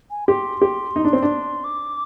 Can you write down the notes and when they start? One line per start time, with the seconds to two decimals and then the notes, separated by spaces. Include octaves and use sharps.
0.11 G#5
0.28 G4 C6
0.62 G4
0.96 D#4
1.05 D4
1.13 C4
1.23 D4
1.64 D6